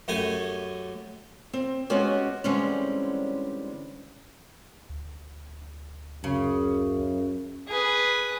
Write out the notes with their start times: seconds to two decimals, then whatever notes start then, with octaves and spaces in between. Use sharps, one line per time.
0.08 F#2 A3 G4 G#5
1.53 C4
1.90 G#3 B3 C#4 F#4 G4
2.44 D3 E3 G3 G#3 C4 C#4
4.90 D2
6.24 F#2 C#3
7.68 G#4 B4